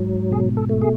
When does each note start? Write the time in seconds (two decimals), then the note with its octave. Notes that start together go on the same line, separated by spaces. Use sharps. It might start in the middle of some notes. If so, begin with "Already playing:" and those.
Already playing: G#2 F#3
0.31 B2 G#4
0.57 A4
0.69 A3
0.82 G#4